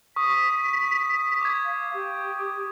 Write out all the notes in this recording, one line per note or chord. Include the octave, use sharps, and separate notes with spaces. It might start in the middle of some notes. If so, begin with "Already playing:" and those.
C#6 D#6 B6
D6 G#6
F5
G4